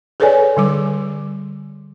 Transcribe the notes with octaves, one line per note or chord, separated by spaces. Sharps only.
G#4 A4 B4 C#5 D5 G#5
D3 G3 D6